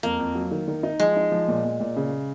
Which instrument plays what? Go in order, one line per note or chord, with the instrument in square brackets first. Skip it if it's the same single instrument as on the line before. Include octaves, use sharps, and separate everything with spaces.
[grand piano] F2 [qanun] A#3
[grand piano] F2
F#3
D#3
D#3
D#4
[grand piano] F3 [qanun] G#3
[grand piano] D#4
F3
A#2
A#2
A#2
C#3